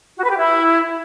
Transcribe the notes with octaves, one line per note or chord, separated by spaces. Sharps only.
F#4
B4
G4
E4